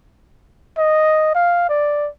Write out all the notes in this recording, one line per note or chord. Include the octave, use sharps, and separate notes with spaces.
D#5
F5
D5